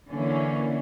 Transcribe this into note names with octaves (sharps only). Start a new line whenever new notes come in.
D3 E3 A#3 C#4